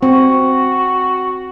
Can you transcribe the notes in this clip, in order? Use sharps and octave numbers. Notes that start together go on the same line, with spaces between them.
C4 F#4